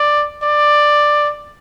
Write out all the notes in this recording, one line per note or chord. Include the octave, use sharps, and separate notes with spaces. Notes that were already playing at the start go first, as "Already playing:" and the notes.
Already playing: D5
D5